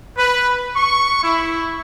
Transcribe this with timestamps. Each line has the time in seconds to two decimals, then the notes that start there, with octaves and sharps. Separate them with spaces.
0.17 B4
0.76 C#6
1.23 E4